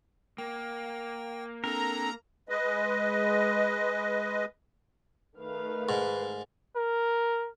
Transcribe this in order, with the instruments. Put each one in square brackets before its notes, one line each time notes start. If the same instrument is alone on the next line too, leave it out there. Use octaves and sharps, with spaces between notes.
[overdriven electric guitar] A#3 [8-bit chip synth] G5
[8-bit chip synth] C4 D4 A4 [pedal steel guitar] A#4 [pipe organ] A#5
[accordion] G#3 B4 D#5
[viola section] D#3 A3 F5 [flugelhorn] B4
[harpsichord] G#2
[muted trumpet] A#4